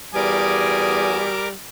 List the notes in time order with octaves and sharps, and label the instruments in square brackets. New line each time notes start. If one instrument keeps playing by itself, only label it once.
[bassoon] E2 [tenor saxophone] G3 [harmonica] F#4 G#5 D#6 [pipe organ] A#4 D6